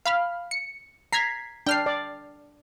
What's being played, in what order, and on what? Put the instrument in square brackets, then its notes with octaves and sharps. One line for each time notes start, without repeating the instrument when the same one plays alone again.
[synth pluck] F5 B5 F6
C#7
[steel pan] A#5 [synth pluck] G#6 B6 C7
[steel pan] D4 [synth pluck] G5 F6 C7
[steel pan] D5